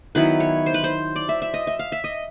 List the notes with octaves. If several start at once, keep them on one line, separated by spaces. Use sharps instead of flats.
D#3 F#3 B3 E4 B4
C#5
C5
B4
C5
D5
E5
E5
D#5
E5
F5
E5
D#5